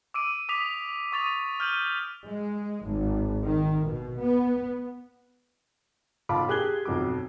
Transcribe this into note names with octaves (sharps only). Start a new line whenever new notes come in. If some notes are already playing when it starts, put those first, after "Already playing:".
D6 E6 D7 D#7
D6 D#6 B6 F7
C#6 D#6 A6 D#7 F7
F6 G6 D#7 F#7
G#3
G#1
D#3
B2
B3
B1 F4 A5 B5 D6
G4 G#4 F#6 G#6 G7
B1 F2 F#3 D6